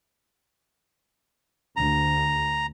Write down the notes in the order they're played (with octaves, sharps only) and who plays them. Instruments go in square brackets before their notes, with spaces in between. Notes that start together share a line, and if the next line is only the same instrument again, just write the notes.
[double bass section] D2 [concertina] A#5